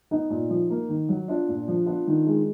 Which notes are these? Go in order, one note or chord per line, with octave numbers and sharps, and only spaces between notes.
B3 D#4
A#2
F3
A#3
D#3
F#3
B3 D4 F4
A#2
F3
B3 D4 F4
D#3
G#3